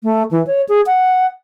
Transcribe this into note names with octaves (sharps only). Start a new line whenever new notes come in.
A3
E3
C#5
G#4
F#5